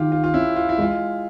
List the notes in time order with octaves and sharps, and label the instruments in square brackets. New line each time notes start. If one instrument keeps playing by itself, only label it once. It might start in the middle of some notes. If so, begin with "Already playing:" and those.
Already playing: [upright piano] D#3 [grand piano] F4 G4
[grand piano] F4
F4
[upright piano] C#4 [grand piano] E4
[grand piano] F4
E4
[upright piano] G#3 [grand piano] F4